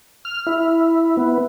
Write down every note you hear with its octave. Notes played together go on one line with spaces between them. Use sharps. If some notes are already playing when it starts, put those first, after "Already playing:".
F6
E4
B3